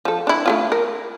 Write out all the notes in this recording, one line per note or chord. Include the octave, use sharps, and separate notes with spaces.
F3 A4
D4 E4
A3 E4 F4
A#4